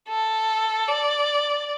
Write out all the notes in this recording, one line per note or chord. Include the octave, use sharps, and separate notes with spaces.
A4
D5